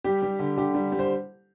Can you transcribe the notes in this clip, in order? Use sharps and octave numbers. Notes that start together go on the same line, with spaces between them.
G3 G4
G3
D3
D3 G4
G3
G3
C5